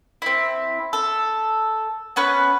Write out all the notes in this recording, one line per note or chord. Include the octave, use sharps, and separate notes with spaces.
C4 E4
A4
B3 C#4 B4